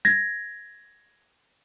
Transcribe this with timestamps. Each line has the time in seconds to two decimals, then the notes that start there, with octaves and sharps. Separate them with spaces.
0.05 G#6 A#6